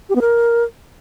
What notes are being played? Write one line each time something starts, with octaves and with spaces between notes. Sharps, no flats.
G4
B3
A#4